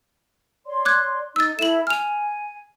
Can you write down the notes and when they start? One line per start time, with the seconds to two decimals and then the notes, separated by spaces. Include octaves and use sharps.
0.66 C#5 D5 C6
0.85 D6 F#6 G#6
1.36 D#4 E6 A6
1.59 E4 A4 E5 E7 F#7
1.87 G#5 F6 F7